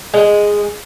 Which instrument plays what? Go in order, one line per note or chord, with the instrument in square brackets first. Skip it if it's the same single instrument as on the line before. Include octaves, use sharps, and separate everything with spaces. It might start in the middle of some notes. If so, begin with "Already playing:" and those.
[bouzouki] G#3